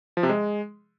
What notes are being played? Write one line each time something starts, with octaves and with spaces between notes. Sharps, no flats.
F3
C3
G#3